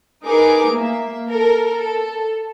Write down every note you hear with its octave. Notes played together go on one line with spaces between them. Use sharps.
D#4 G#4 A#4 B4 D6
A#3 E5
A4 A#4
A4